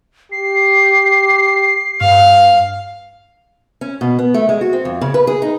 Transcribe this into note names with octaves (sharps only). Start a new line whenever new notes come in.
G4 C7
G2 F5
C#4
B2
B3
A3
G#3
F#4
C4
F2
C#3
B4
G#4
D#4